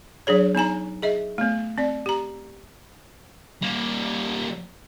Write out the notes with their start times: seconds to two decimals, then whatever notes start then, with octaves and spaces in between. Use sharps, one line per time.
0.27 F#3 D4 G#4 C#5
0.55 B3 D#4 G#5 A#5
1.02 G#4 D#5 E5
1.38 A3 B3
1.78 C4 D5
2.06 G4 A#5
3.62 G3 A#3